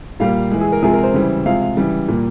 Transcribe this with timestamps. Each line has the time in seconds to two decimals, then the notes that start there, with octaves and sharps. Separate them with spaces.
0.20 A#2 G3 A#3 F5
0.51 E3 G#3
0.61 G#4
0.72 A#4
0.83 C3 F3 G#3 G#4
0.93 A#4
1.03 C5
1.14 C#3 E3 G3
1.46 C3 F3 G#3 F5
1.61 F5
1.77 C#3 E3 G3
2.08 A#2 G3 A#3